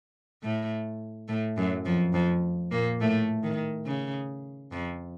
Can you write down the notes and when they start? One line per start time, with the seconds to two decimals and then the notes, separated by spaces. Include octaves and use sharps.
0.43 A2 A3
1.28 A2 A3
1.57 F#2 F#3
1.86 F2 F3
2.14 F2 F3
2.71 A#2 A#3
3.01 A2 A3
3.43 D#3
3.86 C#3
4.72 F2 F3